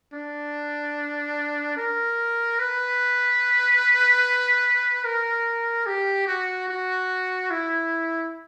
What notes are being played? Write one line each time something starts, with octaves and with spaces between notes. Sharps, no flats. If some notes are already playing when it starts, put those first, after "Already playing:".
D4
A#4
B4
A#4
G4
F#4
F#4
E4